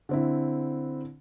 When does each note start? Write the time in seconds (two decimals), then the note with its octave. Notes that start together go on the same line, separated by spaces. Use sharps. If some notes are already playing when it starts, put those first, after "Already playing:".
0.09 D3 C4 E4